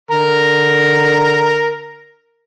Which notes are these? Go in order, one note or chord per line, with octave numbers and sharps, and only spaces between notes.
D3 A#4 A#5